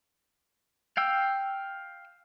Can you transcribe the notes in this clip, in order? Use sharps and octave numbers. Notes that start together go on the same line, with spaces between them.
F5 G5 E6